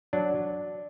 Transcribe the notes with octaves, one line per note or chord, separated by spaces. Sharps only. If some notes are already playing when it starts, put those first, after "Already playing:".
F#3 D4